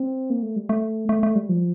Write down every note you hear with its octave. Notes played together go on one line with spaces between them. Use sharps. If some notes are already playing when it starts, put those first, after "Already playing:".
Already playing: C4
A#3
A3
G3
A3
A3
A3
G3
F3